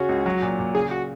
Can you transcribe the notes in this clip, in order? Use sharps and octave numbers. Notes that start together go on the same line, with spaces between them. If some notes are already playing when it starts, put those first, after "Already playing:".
Already playing: C#3 C#4 F#4
C#2
F#3
A#2
A#2
C#3 G#4
F#4